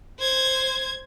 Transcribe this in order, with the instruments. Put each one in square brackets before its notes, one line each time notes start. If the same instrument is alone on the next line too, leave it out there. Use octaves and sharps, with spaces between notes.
[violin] C5 G#6